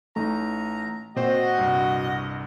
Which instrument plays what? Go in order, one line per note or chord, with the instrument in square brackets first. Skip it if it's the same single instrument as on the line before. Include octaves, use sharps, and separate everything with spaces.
[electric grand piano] A1 D#4 [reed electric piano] A3 [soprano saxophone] A#5
[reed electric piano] A#2 [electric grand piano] C4 C5 G5 [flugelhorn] F#4 [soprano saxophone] D#5
[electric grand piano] C2 G2